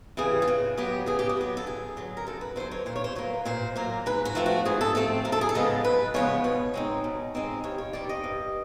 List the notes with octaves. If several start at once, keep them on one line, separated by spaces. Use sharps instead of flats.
C#3 E3 G3 G#4
F4
C#3 F#4
F#3 B3 G4
C#3 G#4
G4
F#4
F#3 B3 G4
A4
F#2 G#4
D3 F#3
A#4
F#2 A4
B4
D3 F#3 C5
C#5
A#2 C5
C#5
C5
F#3 A#3 B4
A#2 C5
F#3 A#3 A#4
G#2 B4
F#4
F3 A3 C4
F#4
G#2 G#4
A4
F3 A3 C4 A4
F#2 A#4
A4
G#4
A4
C#3 F3 G#3 B3
F#2 B4
C#3 F3 G#3 B3 C#5
B2 C#5
G#3 C4 D#4
B2
G#3 C4 D#4
G2 C#5
C#5
D#3 G3 C4 D5
D#5
G2